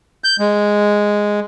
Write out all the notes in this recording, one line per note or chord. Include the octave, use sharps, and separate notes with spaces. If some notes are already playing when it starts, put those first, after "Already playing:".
G6
G#3